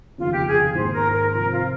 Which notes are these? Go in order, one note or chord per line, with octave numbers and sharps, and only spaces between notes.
F1 D#2 C#3 F4
G4
G#4
G#2 D#3 A#3 C5
A#4
A#4
C3 F3 C4 A#4
F4